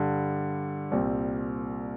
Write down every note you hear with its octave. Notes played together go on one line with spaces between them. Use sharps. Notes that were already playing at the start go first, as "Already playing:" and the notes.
Already playing: G2 D3 G3
C2 A#2 G3 C4